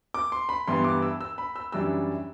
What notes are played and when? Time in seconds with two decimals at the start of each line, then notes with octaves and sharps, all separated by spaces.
0.14 D6
0.32 C6
0.49 B5
0.67 G2 E3 G3 B3 C6
0.84 D6
1.02 E6
1.21 E6
1.38 B5
1.56 E6
1.72 F#2 E3 G3 D4 E6